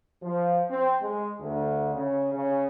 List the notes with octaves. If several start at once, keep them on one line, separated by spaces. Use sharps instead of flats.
F3
C4
G#3
D2
C#3
C#3